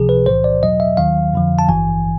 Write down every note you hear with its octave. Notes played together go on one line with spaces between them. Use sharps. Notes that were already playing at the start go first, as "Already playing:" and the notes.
Already playing: C#2 C3 F3 G#4
B4
B1 A2 E3 C5
D5
E2 B2 F#3 D#5
E5
D#2 D#3 F#3 F5
F2 D3 F3
A5
G#1 G2 E3 G#5